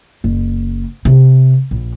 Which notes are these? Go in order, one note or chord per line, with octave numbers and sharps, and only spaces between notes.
F#1
C3
A#1